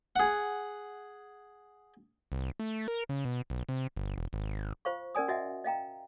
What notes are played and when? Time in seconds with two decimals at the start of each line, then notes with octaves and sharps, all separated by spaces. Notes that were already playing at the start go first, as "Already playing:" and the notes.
0.16 G#4 F#5
2.32 C2
2.60 A3
2.88 A#4
3.09 C#3
3.25 B2
3.50 B1
3.69 C3
3.97 G1
4.18 E1
4.33 G#1
4.85 F4 C5 F5 C#6
5.15 C#4 A#4 D5 G#5 D#6
5.28 F#4 D#5 E5 F#5 G#5
5.64 D#5 F5 G5 A#5